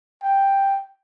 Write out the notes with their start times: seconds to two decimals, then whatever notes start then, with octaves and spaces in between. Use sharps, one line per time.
0.22 G5